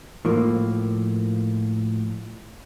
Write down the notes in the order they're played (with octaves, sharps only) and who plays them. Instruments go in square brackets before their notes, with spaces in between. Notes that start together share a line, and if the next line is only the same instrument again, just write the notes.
[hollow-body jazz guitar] A2 F3 A#3